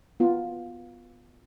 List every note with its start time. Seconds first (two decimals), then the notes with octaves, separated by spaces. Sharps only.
0.20 B3 F4